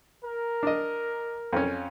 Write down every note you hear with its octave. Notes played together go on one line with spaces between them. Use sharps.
A#4
D4 D#5
F2 C#4